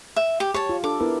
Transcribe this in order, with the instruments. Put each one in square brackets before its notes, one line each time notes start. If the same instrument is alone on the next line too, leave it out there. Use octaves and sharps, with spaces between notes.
[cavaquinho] E5
G4
[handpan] G4 [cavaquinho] C#5 A5
[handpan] F4
[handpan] D4 A4 [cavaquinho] D6
[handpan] B3 E4 A#4